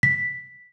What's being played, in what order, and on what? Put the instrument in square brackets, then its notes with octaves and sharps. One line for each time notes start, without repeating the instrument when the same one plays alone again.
[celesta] B6